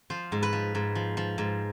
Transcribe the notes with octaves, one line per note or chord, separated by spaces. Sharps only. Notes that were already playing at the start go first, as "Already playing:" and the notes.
F3 C5
G#2
B4
F3
G#2
F3
F3
G#2